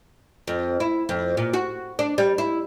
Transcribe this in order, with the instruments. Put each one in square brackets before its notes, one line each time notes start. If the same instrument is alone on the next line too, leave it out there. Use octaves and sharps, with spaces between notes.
[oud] F2
E4
F2
A#2
F#4
D4
G3
E4